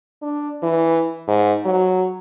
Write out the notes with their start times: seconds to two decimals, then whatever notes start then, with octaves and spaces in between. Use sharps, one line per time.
0.22 D4
0.63 E3
1.28 G#2
1.66 F#3